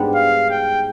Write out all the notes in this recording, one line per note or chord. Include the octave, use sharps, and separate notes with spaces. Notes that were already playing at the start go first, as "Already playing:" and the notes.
Already playing: G#2 G3 B3 D4
F5
G5